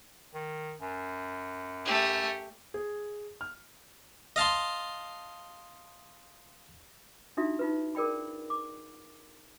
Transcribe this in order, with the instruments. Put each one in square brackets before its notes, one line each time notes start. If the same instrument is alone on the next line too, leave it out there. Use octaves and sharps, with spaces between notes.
[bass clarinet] D#3
F#2
[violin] A3 G4
[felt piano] G#4
F6
[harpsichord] D#5 F5 A5 C6
[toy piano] D4 D#4 F4 F#4 E5 D#6
D#4 F4 B4
G#4 A#4 D5 G5 B5
D6